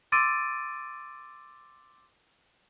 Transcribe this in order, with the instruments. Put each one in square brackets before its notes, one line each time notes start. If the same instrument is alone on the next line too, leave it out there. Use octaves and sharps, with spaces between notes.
[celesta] C6 D6 E6 A6 D7 D#7